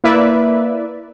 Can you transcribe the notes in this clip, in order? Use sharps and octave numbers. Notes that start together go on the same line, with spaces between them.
A#3 E4 B4 D5 E5